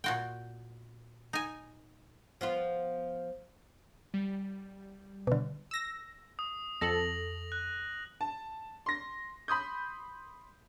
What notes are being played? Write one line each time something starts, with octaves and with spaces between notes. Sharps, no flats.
A#2 F#4 G5
D#4 G#5
F3 B3 F4
G3
B2 D3
E6 A#6
D#6
F2 A4 A#6 F#7
F#6
A5
C6 A#6
B5 C6 D#6 G6